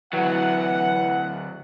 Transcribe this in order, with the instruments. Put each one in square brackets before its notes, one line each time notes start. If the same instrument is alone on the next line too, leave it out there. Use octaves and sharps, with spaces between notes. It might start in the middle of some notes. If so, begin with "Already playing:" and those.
[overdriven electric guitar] D2 F#3 [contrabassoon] E3 [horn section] F#5